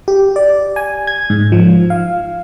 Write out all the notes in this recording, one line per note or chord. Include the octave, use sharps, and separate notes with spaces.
G4
D5
G#5
G#6
G#2
F3
F5